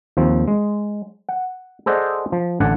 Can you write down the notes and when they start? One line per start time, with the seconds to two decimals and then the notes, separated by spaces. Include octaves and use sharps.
0.17 D#2 F3 C4
0.48 G#3
1.29 F#5
1.86 G#4 A4 C5 D5 D#5 F#5
2.32 F3
2.60 A1 D3 D4 D5 F#5 G#5